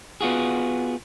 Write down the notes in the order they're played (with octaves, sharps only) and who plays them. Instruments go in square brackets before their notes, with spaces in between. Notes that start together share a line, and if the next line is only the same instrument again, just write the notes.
[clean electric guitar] B3 F4 F#4 G#4